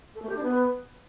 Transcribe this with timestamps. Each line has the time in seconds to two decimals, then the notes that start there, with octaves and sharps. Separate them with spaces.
0.15 A4
0.22 A3
0.29 G4
0.36 D4
0.43 B3